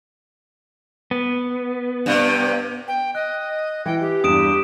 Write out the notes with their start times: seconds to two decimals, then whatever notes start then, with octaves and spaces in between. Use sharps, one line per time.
1.11 B3
2.06 G2 C3
2.88 G5
3.15 D#5 F#6
3.86 E3 G5
4.00 G4
4.24 E2 G2 D#6 D7 E7